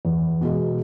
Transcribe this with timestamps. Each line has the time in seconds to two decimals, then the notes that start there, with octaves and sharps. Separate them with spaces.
0.05 E2
0.41 B2 G#3